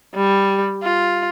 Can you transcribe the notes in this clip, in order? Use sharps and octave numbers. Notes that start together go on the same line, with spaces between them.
G3
F4